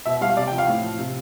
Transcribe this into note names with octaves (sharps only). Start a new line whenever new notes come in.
B2 E5
G3 F5
C3 D5
G5
F3
F5
A2
F3
C3